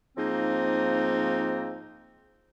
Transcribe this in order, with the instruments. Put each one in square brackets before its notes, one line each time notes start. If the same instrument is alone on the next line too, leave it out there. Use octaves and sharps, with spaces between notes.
[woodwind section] G#2 F3 A#3 C4 D#4